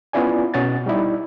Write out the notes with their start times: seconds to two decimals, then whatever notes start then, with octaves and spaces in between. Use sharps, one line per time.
0.13 B3 C#4 E4 F4 D5 G#5
0.54 B2 C#4 F#5 A6
0.86 G3 D#4 E4 D5